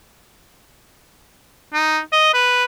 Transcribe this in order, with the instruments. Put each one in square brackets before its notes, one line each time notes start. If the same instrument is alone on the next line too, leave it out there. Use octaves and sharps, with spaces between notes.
[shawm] D#4
D#5
B4